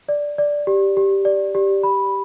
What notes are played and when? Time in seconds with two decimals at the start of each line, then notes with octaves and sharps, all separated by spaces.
0.09 D5
0.38 D5
0.67 G4
0.97 G4
1.25 D5
1.55 G4
1.83 B5